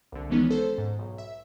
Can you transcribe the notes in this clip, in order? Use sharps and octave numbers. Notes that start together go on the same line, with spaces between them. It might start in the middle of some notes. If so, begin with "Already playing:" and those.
C2 D3
D#3 E3 G#3 B3 C#4 D#4
A4 C5
G#2
B1
E5